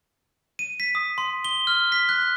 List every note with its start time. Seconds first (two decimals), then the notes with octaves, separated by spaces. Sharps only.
0.59 D#7
0.80 B6
0.95 D#6
1.18 C6
1.45 G7
1.67 F6
1.92 B6
2.09 F#6